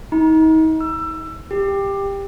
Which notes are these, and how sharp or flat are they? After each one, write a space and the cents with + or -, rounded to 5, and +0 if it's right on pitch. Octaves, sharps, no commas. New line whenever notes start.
D#4 +35
E6 +25
G4 +15